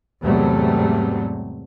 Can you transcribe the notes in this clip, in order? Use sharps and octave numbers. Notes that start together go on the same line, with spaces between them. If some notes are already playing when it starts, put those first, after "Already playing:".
E2 G#2 C3 F#3 G3 A3